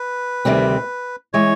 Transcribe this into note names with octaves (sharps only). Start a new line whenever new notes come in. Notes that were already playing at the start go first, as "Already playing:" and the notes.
Already playing: B4
D2 C3 D#3 G3 C4
E3 G#3 C#5